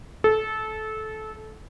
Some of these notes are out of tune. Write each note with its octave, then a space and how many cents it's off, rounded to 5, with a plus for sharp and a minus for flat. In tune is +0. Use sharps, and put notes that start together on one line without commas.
A4 -20